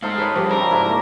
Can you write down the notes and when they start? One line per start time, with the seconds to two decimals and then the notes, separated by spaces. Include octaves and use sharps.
0.02 G#2 D#4 A4 C5 F5
0.18 G#4 B4 C#5
0.36 G2 D#3 F3 G4
0.51 C#3 G3 A4 A#4
0.71 G#2 A3 E4 F#4
0.85 A#3